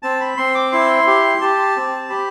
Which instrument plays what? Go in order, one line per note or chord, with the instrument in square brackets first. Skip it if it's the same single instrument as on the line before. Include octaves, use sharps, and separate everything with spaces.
[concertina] C4 A5
B5
C4 C6
D6
E4 C6
G4
G4 A5
C4
G4 B5